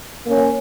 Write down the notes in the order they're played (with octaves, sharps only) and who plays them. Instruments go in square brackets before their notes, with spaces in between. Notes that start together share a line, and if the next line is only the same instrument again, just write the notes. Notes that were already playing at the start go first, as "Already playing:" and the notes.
[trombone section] A#3 C#4